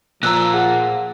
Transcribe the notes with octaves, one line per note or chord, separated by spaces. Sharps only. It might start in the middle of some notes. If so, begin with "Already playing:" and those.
A#2 F3 A#5 E6 F#6
G#4 F#5